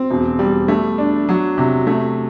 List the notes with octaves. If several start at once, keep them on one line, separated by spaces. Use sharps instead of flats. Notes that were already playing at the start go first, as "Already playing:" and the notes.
Already playing: C4
E1
G3
A3
D4
F#3
C3
A3